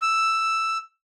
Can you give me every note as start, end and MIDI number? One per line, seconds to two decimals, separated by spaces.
0.02 0.78 88